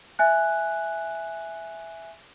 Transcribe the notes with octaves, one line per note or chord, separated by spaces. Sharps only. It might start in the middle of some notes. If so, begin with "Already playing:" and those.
E5 G#5 F#6